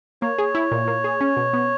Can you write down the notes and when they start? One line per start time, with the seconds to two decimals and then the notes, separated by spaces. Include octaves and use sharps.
0.22 A#3 C#5
0.38 G#4
0.55 E4
0.72 A#2
0.88 A#3
1.04 G#4
1.21 C#4
1.37 B2
1.53 B3